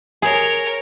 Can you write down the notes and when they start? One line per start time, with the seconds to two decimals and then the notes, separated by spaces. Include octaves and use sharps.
0.22 G#4 A#4 C#5